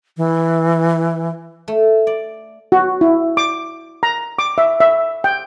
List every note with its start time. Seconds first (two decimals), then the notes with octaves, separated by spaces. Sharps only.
0.17 E3
1.68 A3
2.07 D5
2.72 F#4
3.01 E4
3.37 D6
4.03 A#5
4.39 D6
4.58 E5
4.80 E5
5.24 G5